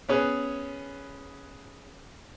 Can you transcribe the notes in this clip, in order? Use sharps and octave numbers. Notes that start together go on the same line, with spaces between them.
B3 C#4 G#4 B4